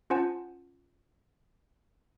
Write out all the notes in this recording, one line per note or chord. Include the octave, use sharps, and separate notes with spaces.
C#4 F4 C5 F#5 G#5 A5